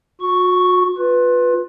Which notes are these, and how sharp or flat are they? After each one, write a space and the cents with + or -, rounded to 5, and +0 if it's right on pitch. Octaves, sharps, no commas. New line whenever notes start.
F#4 -40 C#6 +0
F4 +25 B4 +0